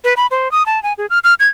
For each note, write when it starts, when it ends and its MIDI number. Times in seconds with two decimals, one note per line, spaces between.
0.04 0.14 71
0.17 0.27 83
0.31 0.51 72
0.52 0.66 87
0.66 0.82 81
0.83 0.93 80
0.98 1.06 68
1.10 1.19 89
1.24 1.34 89
1.40 1.48 92